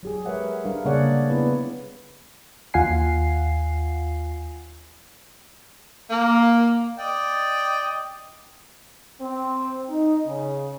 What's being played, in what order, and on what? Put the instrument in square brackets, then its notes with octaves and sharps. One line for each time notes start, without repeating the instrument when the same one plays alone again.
[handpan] F#3 G4 G#4
G#3 A#4 B4 C#5 E5 F#5
G3 D4 A#4 F5
C#3 A#3 G#4 C#5 D5 F#5
B3 E4 G#4 B4
[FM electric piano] D#2 F4 F5 F#5 G#5 C7
[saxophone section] A#3
[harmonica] D5 D#5 G5
[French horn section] C4
D#4
C#3